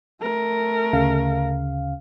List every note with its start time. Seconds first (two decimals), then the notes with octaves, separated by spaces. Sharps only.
0.22 A3 A#4
0.93 D2 C#3 F5